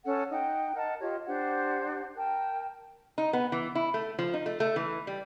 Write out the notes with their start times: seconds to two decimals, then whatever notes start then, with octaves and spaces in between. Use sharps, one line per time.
0.06 C#4 A4 F#5 A5
0.30 D#4 F#5 G5
0.75 A#4 D#5 F#5 A5
1.00 F4 G4 C#5 D#5
1.26 D4 G4 C5 F#5
2.17 A#4 G5 A5
3.18 D#4
3.33 B3
3.52 E3
3.75 E4
3.94 A3
4.19 F3
4.34 D#4
4.46 A3
4.60 A3
4.76 E3
5.07 G3